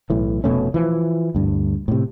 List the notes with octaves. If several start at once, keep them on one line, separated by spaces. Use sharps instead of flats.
B1 A2 E3
F1 B2 A3 C#4
E3 F3
D2 G2
A2 C3